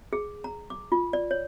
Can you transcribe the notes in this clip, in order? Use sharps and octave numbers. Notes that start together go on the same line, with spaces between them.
G#4
A#5
D6
F4
D5
C#5